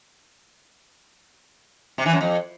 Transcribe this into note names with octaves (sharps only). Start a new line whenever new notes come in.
C3
E3
F#2
F2